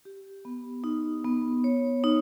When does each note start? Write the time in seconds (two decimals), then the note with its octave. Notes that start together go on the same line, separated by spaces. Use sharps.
0.05 G4
0.45 B3
0.84 D#4
1.24 B3
1.64 C#5
2.04 D#4